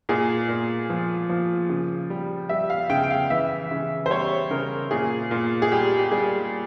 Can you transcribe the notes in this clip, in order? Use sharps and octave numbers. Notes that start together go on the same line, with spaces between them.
A#2 G#4
A#2
F3
F3
C#3
G3
G3 E5
F5
C#3 G5
G5
F5
E3 E5
C#3
C5
G3 C#5
C#3 A#4
A#2 G#4
A#2
G#4
G3 G4
G4
G3 G#4